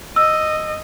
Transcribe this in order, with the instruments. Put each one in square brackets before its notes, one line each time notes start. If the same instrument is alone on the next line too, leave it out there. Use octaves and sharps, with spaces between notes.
[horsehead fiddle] D#5 [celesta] E6